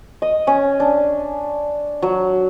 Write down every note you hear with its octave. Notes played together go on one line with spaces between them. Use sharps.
D#5
C#4
D4
F#3